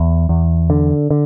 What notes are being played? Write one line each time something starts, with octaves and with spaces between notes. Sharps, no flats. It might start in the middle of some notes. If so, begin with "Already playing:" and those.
Already playing: E2
E2
D3
D3